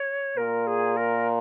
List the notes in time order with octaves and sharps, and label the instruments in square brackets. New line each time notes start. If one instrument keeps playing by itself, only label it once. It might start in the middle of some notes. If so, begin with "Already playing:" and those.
Already playing: [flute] C#5
[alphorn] A#2 [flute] A#4
[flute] G#4
A#4